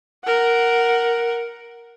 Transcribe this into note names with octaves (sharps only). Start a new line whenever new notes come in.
A#4 F#5